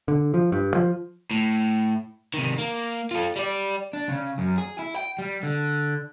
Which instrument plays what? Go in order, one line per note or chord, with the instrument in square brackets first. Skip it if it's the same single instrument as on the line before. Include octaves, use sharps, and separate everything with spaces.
[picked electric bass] D3
F3
G2
F3
[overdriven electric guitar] A2
C3 D#3
A#3
F4 A4
G3 D5
D4
C#3
F#2
G#4
E4
G5
G3
D3